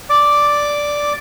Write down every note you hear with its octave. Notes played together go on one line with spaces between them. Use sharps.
D5 D6